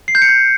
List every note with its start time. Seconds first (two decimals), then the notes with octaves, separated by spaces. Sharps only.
0.08 C7
0.15 G6
0.22 C#7
0.29 G6